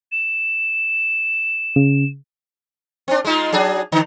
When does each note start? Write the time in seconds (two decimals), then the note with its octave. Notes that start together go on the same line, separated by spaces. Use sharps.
0.12 E7
1.76 C#3
3.08 C4 D4
3.25 G#3 D#4 F4
3.52 F#3 D4 G#4
3.92 D3